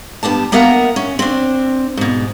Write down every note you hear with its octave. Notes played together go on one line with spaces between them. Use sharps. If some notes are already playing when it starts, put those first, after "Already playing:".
G2 B3 G4 A5
A#3 B3 A#4 E5 F#5 A#5
C#4
C4 D4
G#2 B2